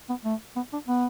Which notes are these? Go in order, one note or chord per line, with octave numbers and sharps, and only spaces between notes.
B3
A3
B3
D4
B3